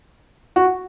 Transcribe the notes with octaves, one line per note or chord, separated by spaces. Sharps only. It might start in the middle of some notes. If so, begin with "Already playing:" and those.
F#4